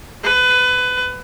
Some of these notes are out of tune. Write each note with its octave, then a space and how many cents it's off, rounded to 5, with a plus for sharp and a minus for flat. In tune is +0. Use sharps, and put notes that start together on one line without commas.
B4 +20